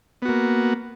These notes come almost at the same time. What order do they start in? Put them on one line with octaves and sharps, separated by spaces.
B3 F#4 A#3